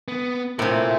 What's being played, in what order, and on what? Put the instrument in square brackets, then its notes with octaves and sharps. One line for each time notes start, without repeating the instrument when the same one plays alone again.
[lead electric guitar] B3
[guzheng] A2 C3 [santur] E4 C5 D6 [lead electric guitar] F4 A#4